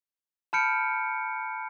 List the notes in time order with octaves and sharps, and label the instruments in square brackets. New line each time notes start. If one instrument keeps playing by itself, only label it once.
[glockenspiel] A5 B5 F6 G6 C#7 D7